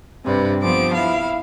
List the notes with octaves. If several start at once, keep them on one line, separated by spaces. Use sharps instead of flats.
G2 C3 B4 D5
F3 B3 C4 D6
E4 F5